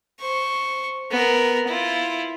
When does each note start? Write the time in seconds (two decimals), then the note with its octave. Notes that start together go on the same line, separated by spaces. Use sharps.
0.20 C5 C#6
1.11 B3 A#4
1.67 E4 F4